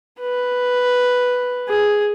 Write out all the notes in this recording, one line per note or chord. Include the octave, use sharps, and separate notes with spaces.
B4
G#4